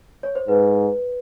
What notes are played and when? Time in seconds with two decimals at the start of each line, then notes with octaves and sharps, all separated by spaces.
0.23 C#5
0.35 C5
0.48 G#2 B4